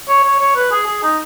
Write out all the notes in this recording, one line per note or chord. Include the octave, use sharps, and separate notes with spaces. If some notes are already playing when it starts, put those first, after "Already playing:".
C#5
C#5
C#5
B4
G#4
G#4
D#4